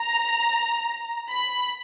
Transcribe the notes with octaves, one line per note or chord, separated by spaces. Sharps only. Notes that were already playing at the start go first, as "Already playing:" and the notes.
Already playing: A#5
B5